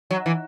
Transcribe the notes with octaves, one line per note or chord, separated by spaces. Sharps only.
F#3
E3